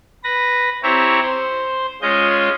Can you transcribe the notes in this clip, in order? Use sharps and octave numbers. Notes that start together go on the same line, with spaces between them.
B4 A#6
C4 E4 G4 C#5 A#5
C5
G#3 C#4 F4 D#5 G6